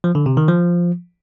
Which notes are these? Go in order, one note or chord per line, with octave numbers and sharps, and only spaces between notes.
F3
D3
C3
D#3
F3